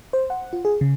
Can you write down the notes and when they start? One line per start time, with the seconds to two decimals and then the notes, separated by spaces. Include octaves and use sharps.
0.13 C5
0.30 F#5
0.53 F4
0.65 G#4
0.81 C#3